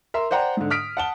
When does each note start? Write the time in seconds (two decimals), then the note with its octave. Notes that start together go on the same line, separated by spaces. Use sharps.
0.14 A#4 E5 C6
0.31 C5 D5 F#5 G5 A#5
0.57 G#2 D3
0.71 D#6 F6 B6 D7
0.97 F#5 A5 G7